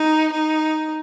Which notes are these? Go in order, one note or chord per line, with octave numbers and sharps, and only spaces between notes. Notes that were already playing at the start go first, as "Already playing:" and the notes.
Already playing: D#4
D#4